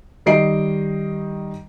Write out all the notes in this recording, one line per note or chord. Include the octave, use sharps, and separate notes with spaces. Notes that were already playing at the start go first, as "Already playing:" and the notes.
D#3 G3 D#5 C7 D7